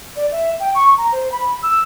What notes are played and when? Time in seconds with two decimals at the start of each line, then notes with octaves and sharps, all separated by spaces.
0.16 D5
0.31 E5
0.60 G5
0.75 C#6
0.97 A#5
1.12 C5
1.32 B5
1.63 E6